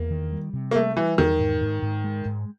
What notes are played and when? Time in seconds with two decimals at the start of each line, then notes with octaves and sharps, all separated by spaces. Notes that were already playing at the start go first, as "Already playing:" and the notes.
Already playing: E2 A#3
0.10 D#3
0.32 G3
0.53 C3
0.71 A#3
0.75 G3 A3
0.97 E3 G3
1.18 E2 D#3
1.39 G#2
1.61 G#2
1.82 G#2
2.04 G#3
2.25 G#2